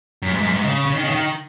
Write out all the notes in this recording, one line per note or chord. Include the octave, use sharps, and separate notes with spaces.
F#2
G#2
F#2
G#2
C#3
C#3
D#3
C#3
D#3